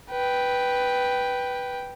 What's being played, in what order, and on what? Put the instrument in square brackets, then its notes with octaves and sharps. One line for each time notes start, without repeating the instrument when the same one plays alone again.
[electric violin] B4 G5